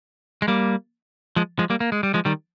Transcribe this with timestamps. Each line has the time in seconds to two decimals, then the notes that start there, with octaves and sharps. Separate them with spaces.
0.42 G#3
0.48 G3 A#3
1.36 F3 G#3
1.59 F3 G#3
1.70 G3 A#3
1.80 A#3
1.92 G#3
2.03 G3
2.14 F3 G#3
2.25 D#3 G3